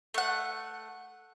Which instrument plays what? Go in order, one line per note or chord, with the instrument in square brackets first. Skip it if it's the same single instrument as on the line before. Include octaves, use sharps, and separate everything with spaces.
[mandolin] A3 F#5